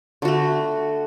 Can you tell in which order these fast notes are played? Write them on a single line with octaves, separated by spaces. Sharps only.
D3 F#4 A3